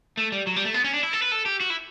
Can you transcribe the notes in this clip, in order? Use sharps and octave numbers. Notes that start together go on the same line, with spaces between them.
A3
G3
F#3
G3
A3
B3
C#4
D4
E4
A4
B4
A4
G4
F#4
E4